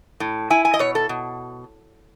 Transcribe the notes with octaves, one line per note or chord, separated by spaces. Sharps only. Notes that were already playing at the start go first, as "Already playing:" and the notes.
A2
E4 G#5
G#5
D#5
B2 C#5
A4
B2